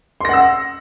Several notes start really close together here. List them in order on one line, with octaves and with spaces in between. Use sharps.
C6 A#6 F#5 E6